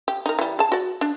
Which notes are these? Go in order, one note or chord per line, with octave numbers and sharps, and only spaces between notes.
G4
D#4 A#4
E3 G3
G#4 A5
F#4 D5
D4